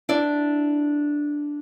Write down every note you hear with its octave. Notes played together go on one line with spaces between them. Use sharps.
D4 E4 D5